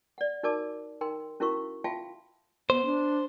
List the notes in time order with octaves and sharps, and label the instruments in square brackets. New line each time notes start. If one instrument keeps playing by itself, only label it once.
[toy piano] D5 F#5
D#4 F#4 A#4 D5 A5 D6
D#4 A#4 G5 C6
C#4 E4 F#4 A#4 F5 C#6
F4 E5 F5 G5 A5 C6
[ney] B3 [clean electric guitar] C5
[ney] D4